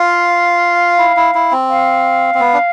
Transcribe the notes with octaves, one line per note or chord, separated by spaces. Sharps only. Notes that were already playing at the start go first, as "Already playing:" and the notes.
Already playing: F4 F5
E4
E4
E4
C4
F5
C4
B3
D4